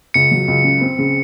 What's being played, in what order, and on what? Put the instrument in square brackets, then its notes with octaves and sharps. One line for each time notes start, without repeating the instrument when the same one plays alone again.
[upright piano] C#2 [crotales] C#7
[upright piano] F#3
C#2
C#3
C4
C#3